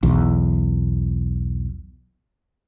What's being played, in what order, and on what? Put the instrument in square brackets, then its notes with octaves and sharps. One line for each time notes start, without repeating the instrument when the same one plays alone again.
[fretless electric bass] B1 E2